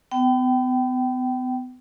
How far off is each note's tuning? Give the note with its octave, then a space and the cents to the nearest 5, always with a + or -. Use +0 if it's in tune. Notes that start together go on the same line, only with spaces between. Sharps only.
B3 +35 G5 -30